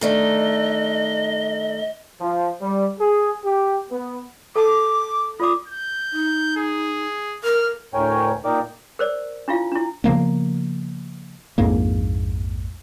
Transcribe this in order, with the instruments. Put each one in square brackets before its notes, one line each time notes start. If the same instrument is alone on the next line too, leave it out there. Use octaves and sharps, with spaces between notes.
[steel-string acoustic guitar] D#3 A3 D4 [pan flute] D#5
[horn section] F3
G3
G#4
G4
B3
[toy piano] A4 A5 [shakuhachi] D6
[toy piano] F4 D5 D6 [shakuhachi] D#6
[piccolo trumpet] G6
[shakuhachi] D#4
[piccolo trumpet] G#4
[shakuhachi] A#4 [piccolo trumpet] F6
[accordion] D2 A2 A#4 C#5 G5 G#5
A#2 D#4 A#4 D5 G5 D6
[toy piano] A#4 C5 D5
D4 E4 F4 F5
D4 E4
[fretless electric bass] C#3 F3 A#3 B3
A#1 F2 G#2 A#3